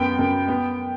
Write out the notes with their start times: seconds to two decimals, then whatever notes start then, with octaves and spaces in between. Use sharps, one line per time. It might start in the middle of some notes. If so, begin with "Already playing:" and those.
Already playing: F#2 B3 G5 B5
0.19 F#2
0.48 B3